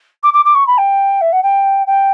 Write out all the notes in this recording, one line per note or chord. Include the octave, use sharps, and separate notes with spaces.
D6
D6
D6
C#6
B5
G5
E5
F#5
G5
G5